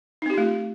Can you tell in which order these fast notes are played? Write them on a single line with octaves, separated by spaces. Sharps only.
D#4 C4 G4 F4 A3